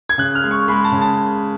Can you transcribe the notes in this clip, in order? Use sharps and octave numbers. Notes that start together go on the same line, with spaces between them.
G#6
C#3 F#6
F6
G#3
C#6
G#3 B5
A5
C#3
A5